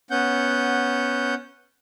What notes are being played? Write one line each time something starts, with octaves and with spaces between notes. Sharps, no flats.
B3 C#4 F#5 G6